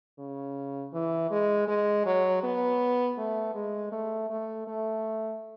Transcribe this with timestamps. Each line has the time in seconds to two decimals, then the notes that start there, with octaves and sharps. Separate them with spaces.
0.18 C#3
0.93 E3
1.31 G#3
1.68 G#3
2.05 F#3
2.43 B3
3.18 A3
3.55 G#3
3.92 A3
4.30 A3
4.67 A3